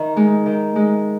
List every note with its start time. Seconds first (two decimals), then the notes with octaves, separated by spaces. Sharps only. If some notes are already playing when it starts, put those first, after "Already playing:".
Already playing: D#3
0.16 G#3 D#4
0.46 D#3
0.76 G#3 D#4